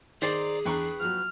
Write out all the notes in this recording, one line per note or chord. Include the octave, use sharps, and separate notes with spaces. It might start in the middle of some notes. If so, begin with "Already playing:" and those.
D#3 G#4 C5 D5 A#5
E2 D4 B4 G5 A#5 C#6
F3 F#3 F6